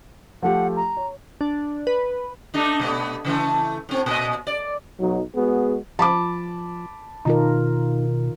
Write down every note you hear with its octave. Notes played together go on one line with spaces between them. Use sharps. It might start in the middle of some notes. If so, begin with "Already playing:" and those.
F3 A3 G4 F#5
A#5
C#5
D4
B4
A3 D4 D#4
B2 A3 B3
C#3 E3 A3
A2 C4
A#2 B4 D#5
D5
B1 F#3 D#4 F#4
G#3 B3 F#4 G#4
F3 A5 B5 D6
B2 D#3 D#4 F4 A#4